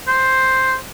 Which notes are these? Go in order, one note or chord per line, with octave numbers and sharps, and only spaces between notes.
C5